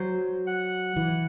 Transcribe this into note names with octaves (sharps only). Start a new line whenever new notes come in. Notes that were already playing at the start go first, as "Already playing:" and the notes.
Already playing: F#3 C5
F#5
E3